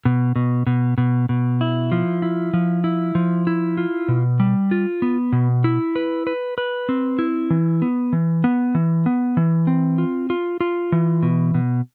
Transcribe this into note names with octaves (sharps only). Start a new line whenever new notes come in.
B2
B2
B2
B2
B2
E4
F3
E4
F3
E4
F3
E4
F4
B2
G3
F4
B3
B2
E4
B4
B4
B4
C4
E4
E3
B3
E3
B3
E3
B3
E3
C4
F4
F4
F4
E3
B2
B2